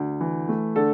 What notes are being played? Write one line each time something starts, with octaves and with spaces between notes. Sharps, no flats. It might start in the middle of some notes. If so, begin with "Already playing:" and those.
Already playing: D2
E3
A3
D3 A4